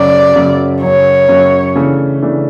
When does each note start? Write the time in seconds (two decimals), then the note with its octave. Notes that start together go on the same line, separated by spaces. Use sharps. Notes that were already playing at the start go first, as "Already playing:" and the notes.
Already playing: F#2 C#3 F#3 D5
0.35 F#2 C#3 F#3
0.81 F#2 C#3 F#3 C#5
1.29 F#2 C#3 F#3
1.75 C#3 E3 A3 D4
2.22 C#3 E3 A3 D4